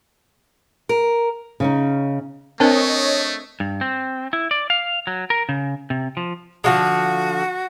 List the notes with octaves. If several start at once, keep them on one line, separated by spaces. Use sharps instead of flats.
A#4
C#3 C#4 D#4
A3 C4 D4 A#4 C5 C#5 D#5 A5
G2
C4
E4
D5
F5
F#3
A#4
C#3
C3
F3
D3 F3 G#3 F#4